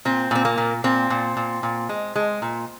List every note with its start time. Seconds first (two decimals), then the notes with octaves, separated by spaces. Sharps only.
0.05 A#2 C4
0.31 A#2 C4
0.45 A#3
0.58 A#2
0.84 A#2 C4
1.10 A#2
1.37 A#2
1.63 A#2
1.89 G#3
2.15 G#3
2.42 A#2